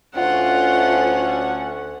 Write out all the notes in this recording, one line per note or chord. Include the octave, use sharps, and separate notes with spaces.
D2 A3 C#4 F4 F#5